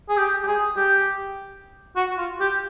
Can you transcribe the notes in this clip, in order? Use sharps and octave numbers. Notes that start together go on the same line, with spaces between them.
G#4
G4
G4
G#4
G4
F#4
F4
G4